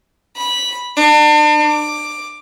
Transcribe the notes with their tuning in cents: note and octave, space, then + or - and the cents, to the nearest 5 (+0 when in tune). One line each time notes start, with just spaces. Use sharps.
B5 -10
D4 +35
D6 +10